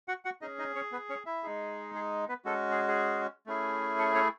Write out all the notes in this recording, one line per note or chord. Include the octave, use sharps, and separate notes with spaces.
F#4 F#5
F#4 F#5
C#4 D#4 G#4 D#5
D#4 D#5
C#4 C#5
B3 B4
C#4 C#5
E4 E5
G#3 D#4 G#4
G#4
B3 B4
G#3 C#4 F#4 A4
G#4
G#4
A3 C#4 E4 G#4
A4
C#4 C#5